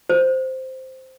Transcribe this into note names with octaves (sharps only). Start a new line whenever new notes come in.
C5